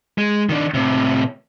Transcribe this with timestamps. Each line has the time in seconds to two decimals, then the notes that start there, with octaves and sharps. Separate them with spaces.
0.18 G#3
0.49 D#3 D4
0.74 A2 C3